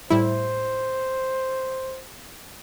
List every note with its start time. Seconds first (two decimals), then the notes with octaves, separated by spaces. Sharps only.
0.10 A2 G3 E4 C5